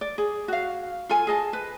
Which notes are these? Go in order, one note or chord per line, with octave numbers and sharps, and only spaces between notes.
D5
G#4
F#4 F5
F4 A4 G#5
G#4 D#5 A5
B4